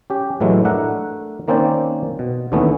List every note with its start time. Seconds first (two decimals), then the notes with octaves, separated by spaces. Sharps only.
0.10 C#4 G4
0.40 A2 E3 F#3 G#3 A3
0.65 A3 D4 A#4 E5 F#5
1.48 D#3 A#3 C4 C#4 C5 D5
2.19 B2
2.52 D#2 D3 E3 A3 B3 C#4